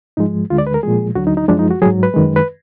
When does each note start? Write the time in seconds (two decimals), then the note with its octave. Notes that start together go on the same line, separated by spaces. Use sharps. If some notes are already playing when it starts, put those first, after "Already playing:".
0.17 G#2 F3 G#3 D#4
0.50 D2 D3 G#3 F4
0.58 D5
0.67 B4
0.74 A#4
0.83 A#2 F3 G#3 G#4
1.15 D2 D3 F#3 F#4
1.27 D#4
1.37 D#4
1.48 F#2 F3 G#3 D4
1.59 D#4
1.71 F#4
1.82 F#3 G#4
1.86 G#2
2.03 B4
2.14 F#2 D#3 G#3
2.36 B4